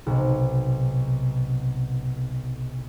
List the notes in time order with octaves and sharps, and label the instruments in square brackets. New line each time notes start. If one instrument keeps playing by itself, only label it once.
[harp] B1 C3